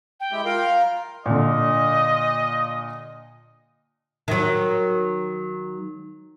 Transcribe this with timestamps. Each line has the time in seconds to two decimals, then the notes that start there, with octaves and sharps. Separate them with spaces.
0.20 G5
0.32 G#3 E4 G4
0.45 F4 A#4 F5
1.26 A#2 D3 D#5
4.28 D#3 F#3